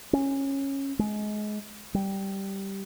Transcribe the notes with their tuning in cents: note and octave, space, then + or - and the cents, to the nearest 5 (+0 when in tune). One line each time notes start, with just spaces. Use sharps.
C#4 -15
G#3 +25
G3 -5